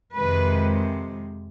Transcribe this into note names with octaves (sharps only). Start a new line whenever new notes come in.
F2 C3 D#3 G#3 B4